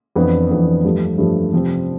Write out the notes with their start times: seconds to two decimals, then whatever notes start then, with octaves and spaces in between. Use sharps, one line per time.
0.15 F2 E3 B3 D4
0.49 F2 E3 B3 D4
0.84 G2 F3 A3
1.18 G2 F3 A3
1.52 C3 F3 C4